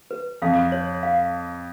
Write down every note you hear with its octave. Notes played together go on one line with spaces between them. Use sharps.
B4
F2 F5
C#5
F5